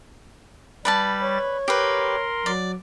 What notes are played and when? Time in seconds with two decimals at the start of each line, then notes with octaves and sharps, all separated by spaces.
0.85 G3 B4 D5 A5 A6
1.22 C#5
1.68 G4 A#4 B4 C6
2.46 F#3 D5